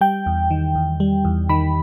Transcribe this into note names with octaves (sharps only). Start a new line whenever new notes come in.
G3 G5
E2
D#3
E2
G3
E2
D#3 B5